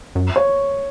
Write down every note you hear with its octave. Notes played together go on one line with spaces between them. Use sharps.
F#2
C#5